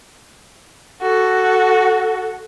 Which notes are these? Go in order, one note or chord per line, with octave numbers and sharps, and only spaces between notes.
F#4 A4